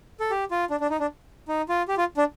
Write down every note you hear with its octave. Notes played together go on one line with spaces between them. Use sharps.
A4
G4
F4
D4
D4
D#4
D4
D#4
F4
G4
F4
D4